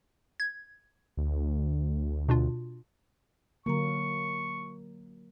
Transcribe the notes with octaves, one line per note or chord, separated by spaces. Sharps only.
G#6
D2
B2 D4 F4
D3 F#3 A#3 A#5 C#6